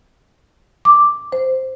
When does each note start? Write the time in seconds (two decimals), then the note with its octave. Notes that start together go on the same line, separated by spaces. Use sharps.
0.85 D6
1.32 C5